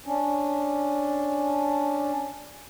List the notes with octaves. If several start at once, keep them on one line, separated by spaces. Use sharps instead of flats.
C#4 D4